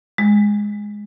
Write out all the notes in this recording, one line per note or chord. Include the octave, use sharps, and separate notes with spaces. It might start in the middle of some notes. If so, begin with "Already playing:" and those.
G#3